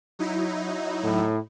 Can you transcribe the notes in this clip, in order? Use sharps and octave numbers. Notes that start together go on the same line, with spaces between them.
F#3 D#4 E4
A2